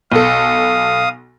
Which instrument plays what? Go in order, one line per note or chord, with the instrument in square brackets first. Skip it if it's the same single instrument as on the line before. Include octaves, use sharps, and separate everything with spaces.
[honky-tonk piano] B1 A4 [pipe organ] F5 D#6